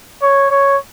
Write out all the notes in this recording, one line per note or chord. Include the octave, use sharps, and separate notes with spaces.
C#5
C#5